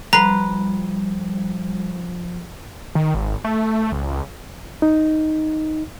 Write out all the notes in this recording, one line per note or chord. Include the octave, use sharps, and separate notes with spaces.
F3 G3 B4 A#5 C6
D#3
G#1
A3
C#2
D#4